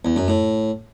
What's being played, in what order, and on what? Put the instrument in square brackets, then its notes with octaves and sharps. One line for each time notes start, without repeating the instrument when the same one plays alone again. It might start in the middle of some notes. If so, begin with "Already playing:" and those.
[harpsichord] E2
F#2
A2